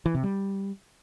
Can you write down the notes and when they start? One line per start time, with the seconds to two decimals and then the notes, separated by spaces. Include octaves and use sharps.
0.06 E3
0.15 C3
0.23 G3